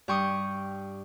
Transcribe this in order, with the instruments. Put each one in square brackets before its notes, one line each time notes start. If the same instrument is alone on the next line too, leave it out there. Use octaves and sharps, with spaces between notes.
[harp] G2 G4 G5 C#6 D#6